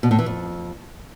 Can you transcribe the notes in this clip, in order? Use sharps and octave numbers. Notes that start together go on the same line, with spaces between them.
B2
A2
E3
F2